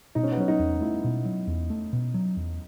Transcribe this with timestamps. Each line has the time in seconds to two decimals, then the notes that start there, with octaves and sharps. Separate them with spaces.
0.15 B2 D#4
0.23 C#4
0.32 B3
0.37 F#3 C#4
0.48 D#4
0.59 E2
0.81 A3 E4
1.04 B2
1.25 F#3
1.47 E2
1.70 A3
1.93 B2
2.14 F#3
2.37 E2